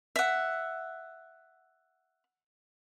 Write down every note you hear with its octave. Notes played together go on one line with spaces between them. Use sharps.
E5 F#5